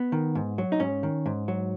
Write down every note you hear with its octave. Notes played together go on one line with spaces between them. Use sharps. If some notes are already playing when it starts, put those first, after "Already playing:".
Already playing: B3
D#3
G#2
F#3
D#4
G#2 C#4
D#3
G#2
F#3